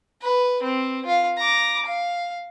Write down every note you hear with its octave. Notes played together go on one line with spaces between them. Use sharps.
B4
C4
F4 F5
A#5 D6
F5